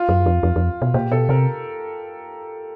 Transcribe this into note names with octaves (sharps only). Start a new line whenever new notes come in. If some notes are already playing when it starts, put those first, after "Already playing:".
Already playing: F4
F#2
F2
F2
F2
B2
A#2 G4
B2 A4
C3 A#4